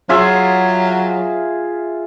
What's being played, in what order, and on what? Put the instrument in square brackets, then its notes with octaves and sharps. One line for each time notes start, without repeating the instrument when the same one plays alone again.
[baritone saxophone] F#3 [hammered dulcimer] F4 G#4 E5